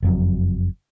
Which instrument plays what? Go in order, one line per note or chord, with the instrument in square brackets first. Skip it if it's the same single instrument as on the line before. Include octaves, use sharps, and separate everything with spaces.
[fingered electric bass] F#1 F2 F#3